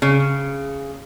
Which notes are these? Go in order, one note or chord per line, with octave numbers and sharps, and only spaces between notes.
C#3